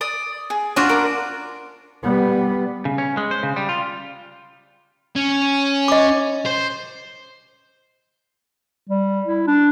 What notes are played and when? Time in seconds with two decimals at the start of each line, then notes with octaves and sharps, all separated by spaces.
0.01 D5 D#6
0.50 G#4
0.76 D4 F4 F#4
0.89 A#4 D6
2.03 G3 B3
2.85 C#3
2.98 C#4
3.17 G#3
3.31 C5
3.43 C#3
3.56 G3
3.69 F4
5.16 C#4
5.88 D#5 D6
6.46 C5
8.89 G3
9.26 E4
9.47 D4